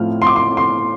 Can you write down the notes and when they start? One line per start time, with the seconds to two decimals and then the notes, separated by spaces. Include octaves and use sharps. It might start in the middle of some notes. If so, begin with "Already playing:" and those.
Already playing: A2 F3 A3 C4 F6
0.22 C6
0.27 D6
0.36 C6
0.57 C6